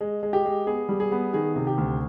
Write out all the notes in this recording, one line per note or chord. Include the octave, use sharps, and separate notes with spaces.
G#3
G#3
G4
G#3
B3 G#4
G3
G#4
B3
D#3 G#4
C3
G4
D2